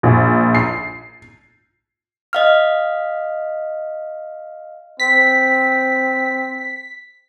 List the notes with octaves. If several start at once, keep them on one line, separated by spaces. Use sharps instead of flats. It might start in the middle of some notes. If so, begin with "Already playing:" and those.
A#1
C7
D#5 F5 F6
C4 B6